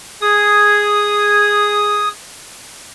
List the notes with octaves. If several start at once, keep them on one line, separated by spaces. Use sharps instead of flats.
G#4 D#6